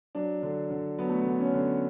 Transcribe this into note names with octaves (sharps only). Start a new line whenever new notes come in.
F#3 D4
D3
D3
F#3 B3
A3
B3
D3
C#4
D3